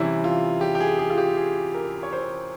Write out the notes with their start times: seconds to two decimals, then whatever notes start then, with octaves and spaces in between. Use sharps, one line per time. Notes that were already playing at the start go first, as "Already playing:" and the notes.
Already playing: C3 E3 G3 C#4 E4
0.24 F4
0.61 G4
0.75 G4
0.80 G#4
0.99 G#4
1.10 F4
1.18 G4
1.37 G#4
1.74 A#4
2.03 C#5
2.13 C5